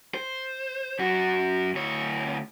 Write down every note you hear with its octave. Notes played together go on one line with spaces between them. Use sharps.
C5
F#2 F#4
D2 C#5